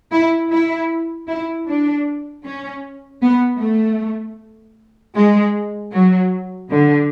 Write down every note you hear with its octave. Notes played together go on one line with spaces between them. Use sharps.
E4
E4
E4
D4
C#4
B3
A3
G#3
F#3
D3